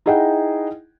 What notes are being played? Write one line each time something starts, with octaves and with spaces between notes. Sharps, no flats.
D#4 E4 G#4 D#5 F#5 G5